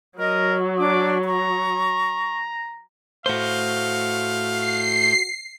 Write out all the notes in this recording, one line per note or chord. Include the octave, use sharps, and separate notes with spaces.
F#3 A#4 D#5
D4 D6
A#5 C#6
A2 A3 F#4 C5 F5 G6
C7